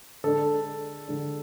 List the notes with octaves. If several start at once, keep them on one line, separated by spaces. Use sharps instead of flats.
D3 G#3 D4 A4
D3 G#3 D4